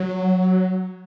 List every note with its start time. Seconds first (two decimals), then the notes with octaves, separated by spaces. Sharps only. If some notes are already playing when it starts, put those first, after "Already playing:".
Already playing: F#3